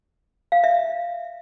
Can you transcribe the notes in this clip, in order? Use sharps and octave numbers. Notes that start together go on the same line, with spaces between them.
F5
E5